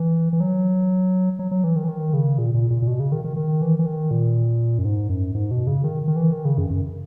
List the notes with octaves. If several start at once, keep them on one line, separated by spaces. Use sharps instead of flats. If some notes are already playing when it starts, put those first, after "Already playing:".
Already playing: E3
E3
F#3
F#3
F#3
E3
D#3
E3
D#3
C#3
A#2
A#2
A#2
A#2
B2
C#3
D#3
D#3
D#3
E3
E3
D#3
A#2
F#2
G#2
F#2
G#2
B2
C#3
D#3
D#3
E3
D#3
C#3
F#2
F#2